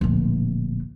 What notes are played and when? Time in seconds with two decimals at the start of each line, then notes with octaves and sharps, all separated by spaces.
0.01 D1 A#1